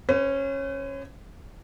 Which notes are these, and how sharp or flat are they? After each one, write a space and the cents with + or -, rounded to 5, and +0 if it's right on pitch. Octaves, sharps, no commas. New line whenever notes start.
C#4 -15 B4 +45